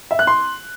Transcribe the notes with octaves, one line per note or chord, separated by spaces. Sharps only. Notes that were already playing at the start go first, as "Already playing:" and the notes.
E5
F#6
C6